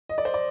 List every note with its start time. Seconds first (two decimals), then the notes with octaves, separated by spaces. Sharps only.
0.09 D#5
0.18 D5
0.25 C5
0.34 D5